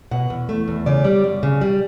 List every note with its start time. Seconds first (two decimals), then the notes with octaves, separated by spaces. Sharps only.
0.11 B2 F#5
0.30 E2
0.49 A3
0.68 E2
0.86 C#3 D5
1.04 G3
1.24 F#2
1.43 C#3
1.61 G3